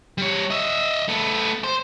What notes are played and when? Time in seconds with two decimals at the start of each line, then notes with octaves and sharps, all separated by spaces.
0.18 G3 C#5
0.50 D#5 E5
1.09 A3 B3
1.64 C5